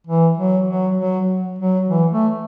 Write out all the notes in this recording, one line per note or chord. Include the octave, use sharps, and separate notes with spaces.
E3
F#3
F#3
F#3
F#3
E3
A3